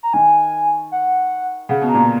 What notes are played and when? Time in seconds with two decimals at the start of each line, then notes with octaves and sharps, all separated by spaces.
0.03 A#5
0.13 D#3 G#5
0.92 F#5
1.69 C#3 F#5
1.81 B2
1.89 A#5
1.94 A#2